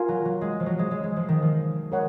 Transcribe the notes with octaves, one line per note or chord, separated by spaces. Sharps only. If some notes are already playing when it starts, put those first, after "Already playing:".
Already playing: F4 A#4 F5 G#5
F#3
F#3
G#3
F3
F#3
G#3
G#3
G#3
F3
D#3
F3
G#3 A#4 C#5 F#5